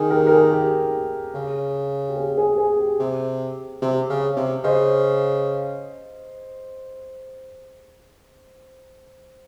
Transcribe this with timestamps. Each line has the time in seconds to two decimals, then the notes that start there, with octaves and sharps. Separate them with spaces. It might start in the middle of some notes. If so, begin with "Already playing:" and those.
Already playing: D#3 G#4
0.10 G4 A#4
0.27 A#4
0.31 G#4
0.51 G4
1.34 C#3
2.09 G4
2.17 G#4
2.37 G#4
2.58 G#4
2.79 G4
2.99 C3
3.82 C3
4.10 C#3
4.37 C3
4.64 C#3 C5 D#5